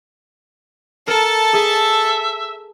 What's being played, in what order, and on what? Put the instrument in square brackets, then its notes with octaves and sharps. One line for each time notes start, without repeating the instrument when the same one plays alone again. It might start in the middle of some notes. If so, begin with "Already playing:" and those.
[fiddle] A4 A5 [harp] A#4
[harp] G#4 [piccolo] E5